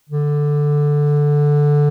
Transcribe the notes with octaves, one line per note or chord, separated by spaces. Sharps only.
D3